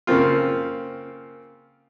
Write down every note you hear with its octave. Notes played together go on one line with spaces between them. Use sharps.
C#3 A#3 C4 F4